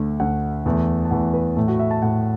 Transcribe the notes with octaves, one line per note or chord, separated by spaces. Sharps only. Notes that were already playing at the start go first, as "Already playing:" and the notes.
Already playing: D2 D3 A3
D2 D3 A3 F#5
E2 E3 A3
A5
E2 E3 A3 F#5
B4
A2 A3
F#4
E5
A5
A2 A3 F#5